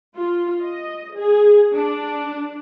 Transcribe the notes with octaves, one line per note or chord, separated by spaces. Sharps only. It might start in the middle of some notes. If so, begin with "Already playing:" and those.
F4
D#5
G#4
D4